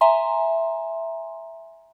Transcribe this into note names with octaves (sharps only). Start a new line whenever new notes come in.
E5 G#5 A#5 C6